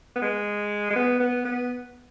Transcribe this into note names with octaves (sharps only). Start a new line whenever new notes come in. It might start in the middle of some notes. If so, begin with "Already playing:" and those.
B3
G#3
G#3
B3
B3
B3